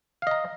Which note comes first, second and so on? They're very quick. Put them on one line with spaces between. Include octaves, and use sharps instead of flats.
F5 D#5 A#5